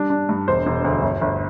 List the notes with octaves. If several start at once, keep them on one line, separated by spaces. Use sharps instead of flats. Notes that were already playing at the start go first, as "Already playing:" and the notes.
Already playing: G3 D4
D4
G2
E1 C5
E1
D2
G1
G1